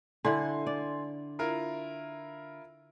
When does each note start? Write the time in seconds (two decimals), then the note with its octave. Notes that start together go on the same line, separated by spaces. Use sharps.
0.25 D3 E4 F#5 G#5 C6
0.66 D5
1.39 E4 F4 A#4